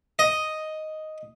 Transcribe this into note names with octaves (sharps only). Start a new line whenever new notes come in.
D#5